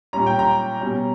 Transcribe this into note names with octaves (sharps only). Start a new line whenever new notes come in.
A#2 G3 C#4 A#5
G5
A#5
B2 G3 C#4